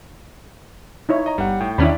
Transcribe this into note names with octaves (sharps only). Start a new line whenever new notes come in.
D#4 E4 C#5
D#5 A#5
G1 G3 F#5
A2 G5
E2 D#3 C#4 D4 E4 D5 B5